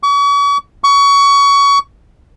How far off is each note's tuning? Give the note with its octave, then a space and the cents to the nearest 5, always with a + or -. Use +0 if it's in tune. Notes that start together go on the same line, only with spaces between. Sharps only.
C#6 +40
C#6 +25